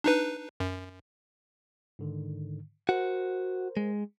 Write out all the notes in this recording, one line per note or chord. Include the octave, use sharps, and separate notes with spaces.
D4 D#4 B4
F#2
G#2 D3 D#3
F#4 A#4 C5 F#5
G#3